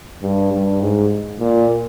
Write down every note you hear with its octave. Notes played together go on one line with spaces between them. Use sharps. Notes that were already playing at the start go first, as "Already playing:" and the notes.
G2
G2
G#2
A#2